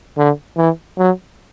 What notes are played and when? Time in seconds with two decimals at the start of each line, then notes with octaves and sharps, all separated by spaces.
0.18 D3
0.57 E3
0.98 F#3